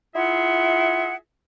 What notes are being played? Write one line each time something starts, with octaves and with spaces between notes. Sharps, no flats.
E4 F4 G#4 E5 F#5